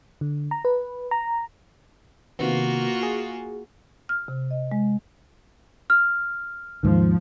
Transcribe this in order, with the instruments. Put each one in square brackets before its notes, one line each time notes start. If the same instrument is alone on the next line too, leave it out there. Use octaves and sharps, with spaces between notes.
[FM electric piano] D3
A#5
B4
A#5
[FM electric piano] C3 D#3 B3 [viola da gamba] A#3 F4 F#4
[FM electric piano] G#4
[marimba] F6
C3
D#5
G#3
[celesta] F6
[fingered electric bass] D#2 G#2 D#3 [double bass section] F3